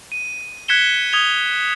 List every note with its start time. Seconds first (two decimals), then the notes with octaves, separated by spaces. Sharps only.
0.12 D#7
0.68 F#6 G#6 B6 C#7 E7 G7
1.13 D#6 G#6 F7 G7